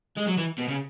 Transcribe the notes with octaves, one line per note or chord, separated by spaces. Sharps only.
G#3
F#3
E3
B2
C#3